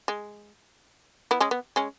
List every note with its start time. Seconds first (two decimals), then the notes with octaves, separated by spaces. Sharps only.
0.08 G#3
1.31 B3 E4
1.40 G#3 C#4
1.51 B3
1.76 G#3 C#4